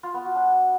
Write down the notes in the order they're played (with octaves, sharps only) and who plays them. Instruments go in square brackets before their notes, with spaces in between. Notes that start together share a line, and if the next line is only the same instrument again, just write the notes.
[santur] F4
B3
F#4
D4